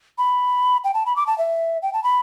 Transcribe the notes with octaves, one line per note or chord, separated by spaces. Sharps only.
B5
G5
A5
B5
D6
A5
E5
G5
A5
B5